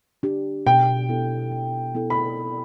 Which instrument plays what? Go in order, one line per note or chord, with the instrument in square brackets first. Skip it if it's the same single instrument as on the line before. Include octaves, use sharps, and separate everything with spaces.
[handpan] D4 G4
[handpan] B2 [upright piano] G5
[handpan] B3 E4 A4
B2
B3 E4 A4
[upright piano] B5